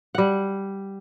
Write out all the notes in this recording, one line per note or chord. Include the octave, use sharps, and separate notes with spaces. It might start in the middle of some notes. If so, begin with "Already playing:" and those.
G3 F#5